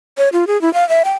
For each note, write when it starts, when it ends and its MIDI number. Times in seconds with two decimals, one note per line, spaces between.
0.18 0.29 73
0.33 0.47 65
0.47 0.60 68
0.62 0.72 64
0.74 0.87 77
0.89 1.03 76
1.05 1.15 79